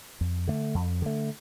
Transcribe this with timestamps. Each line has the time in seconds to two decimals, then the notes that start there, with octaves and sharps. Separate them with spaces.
0.21 F2
0.48 D3 A3
0.75 F2
1.02 D3 A3